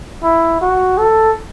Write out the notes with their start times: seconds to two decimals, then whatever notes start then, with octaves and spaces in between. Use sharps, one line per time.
0.23 E4
0.61 F#4
0.98 A4